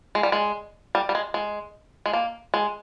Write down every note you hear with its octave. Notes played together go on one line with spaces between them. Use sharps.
G#3
G3
G#3
G3
G3
G#3
G#3
G#3
A#3
G#3